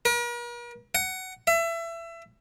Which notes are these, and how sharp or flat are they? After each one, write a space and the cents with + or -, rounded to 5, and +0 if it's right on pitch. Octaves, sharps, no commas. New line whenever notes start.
A#4 +45
F#5 +15
E5 +25